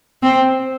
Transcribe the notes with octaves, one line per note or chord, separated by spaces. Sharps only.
C4